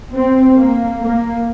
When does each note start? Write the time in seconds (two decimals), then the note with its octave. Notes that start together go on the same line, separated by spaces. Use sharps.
0.14 C4
0.58 A#3
1.01 A#3